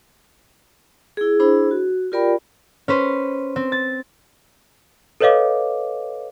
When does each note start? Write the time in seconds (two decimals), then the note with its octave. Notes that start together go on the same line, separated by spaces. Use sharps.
1.17 E4 G#4
1.40 D4 E4 G#4 C5 B5
1.71 F#4
2.12 F4 G4 A#4 D5 G5 B5
2.88 C#4 B4 C5
3.56 C4
3.72 A6
5.20 A4 B4 C#5 D#5 F5 D6